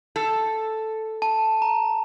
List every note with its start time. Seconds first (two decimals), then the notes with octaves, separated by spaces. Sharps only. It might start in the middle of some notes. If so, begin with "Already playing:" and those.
0.16 A4
1.22 A5
1.62 A#5